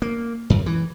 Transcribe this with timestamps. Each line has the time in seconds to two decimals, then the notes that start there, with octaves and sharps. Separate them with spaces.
0.02 A#3
0.50 F#2
0.66 E3